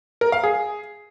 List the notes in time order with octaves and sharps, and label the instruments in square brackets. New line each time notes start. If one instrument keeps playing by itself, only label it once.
[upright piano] A#4
F5
G#4